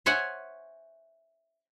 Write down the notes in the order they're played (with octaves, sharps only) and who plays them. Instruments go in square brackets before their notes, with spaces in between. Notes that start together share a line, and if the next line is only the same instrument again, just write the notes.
[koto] C5 C#5 E5 F#5 G#5